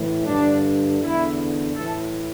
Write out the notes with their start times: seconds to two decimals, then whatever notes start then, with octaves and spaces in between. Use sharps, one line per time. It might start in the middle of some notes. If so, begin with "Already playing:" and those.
Already playing: A2 E3
0.26 G2 D3 D4
1.00 E2 D3 E4
1.74 A2 E3 A4